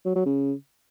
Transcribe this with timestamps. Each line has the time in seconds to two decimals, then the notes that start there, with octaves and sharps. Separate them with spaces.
0.05 F#3
0.16 F#3
0.26 C#3